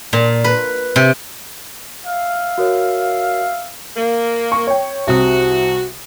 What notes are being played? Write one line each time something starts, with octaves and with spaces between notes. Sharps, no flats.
A#2
B4
C3
E5 F5
F#4 A#4 C#5
A#3
C#6
C#5 G5
C2 C3 F#4 D#6